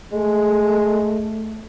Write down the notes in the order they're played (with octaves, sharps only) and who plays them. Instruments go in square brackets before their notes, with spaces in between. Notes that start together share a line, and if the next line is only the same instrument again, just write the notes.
[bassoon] G#3 [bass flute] A3